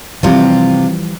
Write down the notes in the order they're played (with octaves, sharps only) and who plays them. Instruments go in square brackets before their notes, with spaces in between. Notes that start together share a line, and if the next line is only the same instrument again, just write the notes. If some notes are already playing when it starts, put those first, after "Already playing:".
[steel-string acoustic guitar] C3 F4 [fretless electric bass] E3 F3 G3